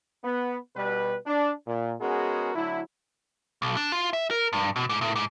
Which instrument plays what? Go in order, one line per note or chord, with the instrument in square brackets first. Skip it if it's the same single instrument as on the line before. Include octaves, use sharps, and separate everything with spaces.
[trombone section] B3
B2 G3 B4
D4
A#2
G#3 B3 C#4 F#4 G#4 A#4
D3 F#3 A3 E4
[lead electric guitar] B1
D4
F4
E5
A#4
G2
B2
G#2
A2
G#2